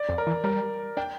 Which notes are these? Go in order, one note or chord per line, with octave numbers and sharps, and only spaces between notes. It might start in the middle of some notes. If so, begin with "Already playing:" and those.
Already playing: D5
F2
A#4
E3
G3 A#4
D4 G5